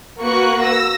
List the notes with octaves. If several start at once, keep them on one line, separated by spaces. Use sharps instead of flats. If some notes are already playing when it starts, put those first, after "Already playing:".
A#3 F#4 B4 C#6 F#6
E6 A#6